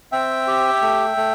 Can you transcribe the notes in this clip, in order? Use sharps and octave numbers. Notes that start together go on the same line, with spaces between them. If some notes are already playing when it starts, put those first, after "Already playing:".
C4 E5 G5
G4
A3
A3